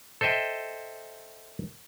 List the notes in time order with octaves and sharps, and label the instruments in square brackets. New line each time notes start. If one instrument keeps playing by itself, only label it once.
[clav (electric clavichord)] A4 C5 D#5 E5 G5